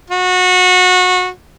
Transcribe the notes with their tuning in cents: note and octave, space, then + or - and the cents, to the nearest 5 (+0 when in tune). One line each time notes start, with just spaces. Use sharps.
F#4 -25